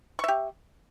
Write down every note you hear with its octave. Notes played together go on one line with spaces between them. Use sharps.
G4 E5 C#6